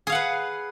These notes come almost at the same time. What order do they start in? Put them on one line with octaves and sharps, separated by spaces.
G#4 F5 F#5 B4